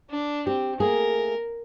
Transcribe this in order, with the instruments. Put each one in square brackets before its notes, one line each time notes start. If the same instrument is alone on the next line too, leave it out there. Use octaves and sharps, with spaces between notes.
[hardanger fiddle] D4
[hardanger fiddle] C4 [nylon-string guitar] G4
[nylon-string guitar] A3 A#3 G#4 [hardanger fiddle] A#4